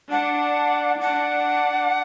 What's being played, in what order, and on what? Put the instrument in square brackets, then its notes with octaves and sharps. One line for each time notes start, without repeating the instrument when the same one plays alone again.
[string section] D4 [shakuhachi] F#5
[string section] D4 [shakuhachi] F#5